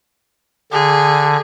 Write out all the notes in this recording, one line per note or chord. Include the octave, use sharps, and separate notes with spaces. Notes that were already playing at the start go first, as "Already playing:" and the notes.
D3 G#4